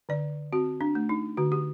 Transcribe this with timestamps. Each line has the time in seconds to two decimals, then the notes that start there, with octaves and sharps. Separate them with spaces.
0.09 D3 D5
0.52 C4 F#4
0.81 D4
0.95 A3
1.09 D#4
1.37 D3 F#4
1.52 G4